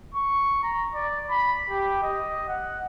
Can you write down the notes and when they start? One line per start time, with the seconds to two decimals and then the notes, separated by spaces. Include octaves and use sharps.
0.15 C#6
0.63 A#5
0.95 D5
1.30 B5
1.70 G4
2.02 D#5
2.48 F#5